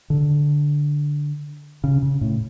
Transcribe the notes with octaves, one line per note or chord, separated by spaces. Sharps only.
D3
C#3
C#3
A2